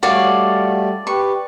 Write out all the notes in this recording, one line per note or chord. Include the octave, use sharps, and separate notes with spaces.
G3 A3 F#4 C#5 D5 F5
G4 B4 C#6